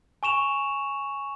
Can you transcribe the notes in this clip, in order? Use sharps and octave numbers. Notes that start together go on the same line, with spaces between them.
G#5 C#6 E7 F7